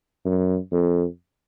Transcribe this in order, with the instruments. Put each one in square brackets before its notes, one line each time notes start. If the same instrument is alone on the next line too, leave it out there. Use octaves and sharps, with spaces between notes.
[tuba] F#2
F2